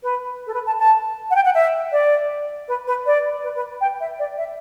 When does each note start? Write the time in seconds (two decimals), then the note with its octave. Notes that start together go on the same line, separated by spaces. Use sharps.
0.03 B4
0.46 A4
0.54 B4
0.66 A5
0.78 A5
1.30 F#5
1.35 G5
1.45 F#5
1.54 E5
1.92 D5
2.68 B4
2.87 B4
3.06 D5
3.43 B4
3.55 B4
3.80 G5
4.00 E5
4.19 D5
4.37 E5